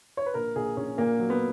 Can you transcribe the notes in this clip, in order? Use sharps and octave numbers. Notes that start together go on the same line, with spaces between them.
C#5
B4
A#1 A#4
A#1 G#4
A#1 C#4
A#2 A#3
F#3
B3